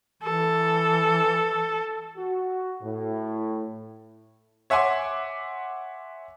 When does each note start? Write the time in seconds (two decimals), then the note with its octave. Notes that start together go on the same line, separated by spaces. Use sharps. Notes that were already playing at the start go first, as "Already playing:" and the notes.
0.22 E3 A4
2.17 F#4
2.82 A2
4.70 C#5 E5 F#5 G#5 C6 D6